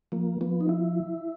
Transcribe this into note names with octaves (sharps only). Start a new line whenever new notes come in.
F3 A#3
F3 B3
D#4
E4